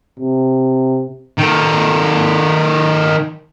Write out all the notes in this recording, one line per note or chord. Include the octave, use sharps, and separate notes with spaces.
C3
D#3 A4